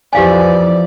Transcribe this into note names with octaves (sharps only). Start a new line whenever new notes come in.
F2 E3 F3 G4 D5 F5 G#5